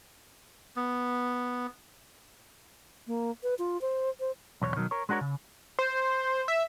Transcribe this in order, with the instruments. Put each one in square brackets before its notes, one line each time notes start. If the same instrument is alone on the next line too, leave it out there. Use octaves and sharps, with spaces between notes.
[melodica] B3
[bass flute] A#3
B4
F4
C5
C5
[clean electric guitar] B1 E2 C#5
B2 D#3 F3 F#3
A#4 C#5
G#3 D4 F#4 A#4 C#5
C#3
[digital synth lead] C5
E5